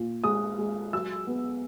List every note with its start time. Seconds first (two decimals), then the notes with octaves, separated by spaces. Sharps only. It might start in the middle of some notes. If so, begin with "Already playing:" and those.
Already playing: A#2
0.24 G#3 D#6
0.58 G#3
0.93 F#3 E6
1.27 B3